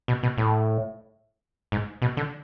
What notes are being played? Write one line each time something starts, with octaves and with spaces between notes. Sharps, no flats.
B2
B2
A2
G#2
B2
D3